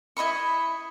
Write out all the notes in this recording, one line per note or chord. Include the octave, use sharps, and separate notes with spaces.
E4 D#5 B5 C#6